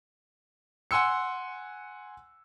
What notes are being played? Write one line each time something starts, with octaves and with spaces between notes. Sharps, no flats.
F#5 G#5 C6 E6 C#7